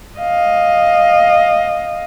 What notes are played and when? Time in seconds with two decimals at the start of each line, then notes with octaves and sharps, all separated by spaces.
0.19 D#5 F5